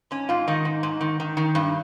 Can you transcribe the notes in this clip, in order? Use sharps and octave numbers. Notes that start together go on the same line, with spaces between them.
G#2 C#4
G#2 F4
D#3 D#4
G#2
G#2
D#3
D#3
D#3
G2